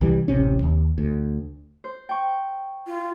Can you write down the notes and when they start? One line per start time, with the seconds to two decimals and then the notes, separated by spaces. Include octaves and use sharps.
0.01 C2 E3 G3
0.28 D1 A1 C3 C#4
0.63 D#2
0.98 D2
1.84 C5
2.09 G5 C#6
2.87 F4